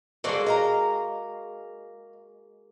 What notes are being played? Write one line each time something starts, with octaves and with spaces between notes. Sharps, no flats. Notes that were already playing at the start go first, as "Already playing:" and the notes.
G#3 A#3 F#4 A4 C5 D5
D#5 F5 A#5